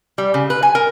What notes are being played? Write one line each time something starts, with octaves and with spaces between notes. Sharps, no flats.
G3
C#3
B4
G#5
A#4